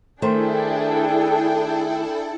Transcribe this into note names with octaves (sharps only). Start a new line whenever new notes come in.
D#3 A3 D4 E4 G#4 A4 C5 G5